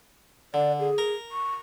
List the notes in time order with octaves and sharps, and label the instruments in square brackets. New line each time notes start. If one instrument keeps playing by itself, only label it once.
[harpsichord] D3 [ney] D5
[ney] G#4
[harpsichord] A#4
[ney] C#6